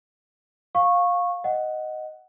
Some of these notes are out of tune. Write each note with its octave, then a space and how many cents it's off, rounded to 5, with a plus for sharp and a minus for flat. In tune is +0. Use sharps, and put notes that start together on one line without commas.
F5 +15 C#6 -10
D#5 +0 F#5 +5